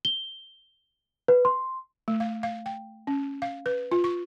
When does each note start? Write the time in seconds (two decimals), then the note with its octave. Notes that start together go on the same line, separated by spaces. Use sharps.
0.05 G7
1.28 B4
1.45 C6
2.08 A3
2.20 F5
2.43 F5
2.66 G5
3.07 C#4
3.42 F5
3.66 B4
3.92 F4
4.04 C#6